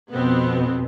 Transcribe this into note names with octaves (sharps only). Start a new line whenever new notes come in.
F2 B2 B3 C4